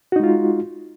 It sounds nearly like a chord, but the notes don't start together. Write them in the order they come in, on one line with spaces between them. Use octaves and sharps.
F#4 D#4 G#3 F4